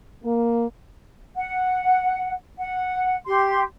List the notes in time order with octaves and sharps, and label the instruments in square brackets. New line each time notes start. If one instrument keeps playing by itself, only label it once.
[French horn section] A#3
[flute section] F#5
F#5
G4 C6